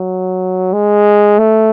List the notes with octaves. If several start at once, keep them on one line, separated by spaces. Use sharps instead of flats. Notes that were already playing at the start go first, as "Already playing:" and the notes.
Already playing: F#3
G#3
A3